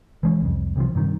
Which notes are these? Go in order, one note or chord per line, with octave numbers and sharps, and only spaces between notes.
E3 G#3 C#4
C2 F2
C2 C3 D#3 F3
G2 C3 D#3